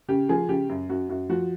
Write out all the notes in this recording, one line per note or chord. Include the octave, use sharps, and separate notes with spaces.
C#3 G4
F3 G#4
C#3 G4
F#2
F#2 F#4
F#2 F#4
F3 F#4